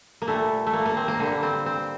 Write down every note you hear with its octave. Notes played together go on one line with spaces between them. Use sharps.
A#3
A#2 G3 A3
A3
A#3
A#3
C4
A#3
D3 G3 A#3
C4
C4